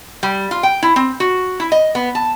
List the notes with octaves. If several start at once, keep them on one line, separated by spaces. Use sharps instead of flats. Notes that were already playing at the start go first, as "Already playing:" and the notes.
G3
F4
G5
E4
C4
F#4
E4
D#5
B3
A5